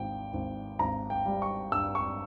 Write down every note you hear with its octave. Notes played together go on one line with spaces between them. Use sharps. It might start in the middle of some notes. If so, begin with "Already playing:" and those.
Already playing: G#1 G5
G#1
G#1 A#5
G5
G3
C#6
G2 E6
C#6